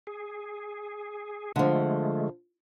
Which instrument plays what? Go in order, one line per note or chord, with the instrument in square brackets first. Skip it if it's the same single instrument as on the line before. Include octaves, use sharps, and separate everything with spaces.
[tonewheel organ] G#4
[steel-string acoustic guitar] D3 F3 [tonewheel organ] G#3 A3